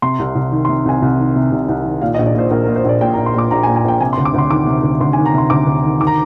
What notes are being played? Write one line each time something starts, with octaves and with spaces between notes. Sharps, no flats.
C3 C6
C2
C2
D#3
C6
C3
C2 G#5
C2
D#3
C3
C2
C2
D#3
A#2 F5
D#5
A#1
D5
A#2 C5
A#1 A#4
A#4
A#2
C5
A#1 D5
A#2 G5
A#5
A#1
C6
A#2 D6
A#1 A#5
G#5
A#2
G#5
A#1 G5
C3 G#5
C6
D2
D6
D2 C6
D#3 D6
C3
D2
D2 C6
G#5
D#3
A#5
C3 C6
D2 D6
D2
D#3
D#3 D6
A#5